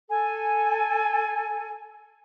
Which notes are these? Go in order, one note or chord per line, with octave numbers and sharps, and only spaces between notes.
A4 G#5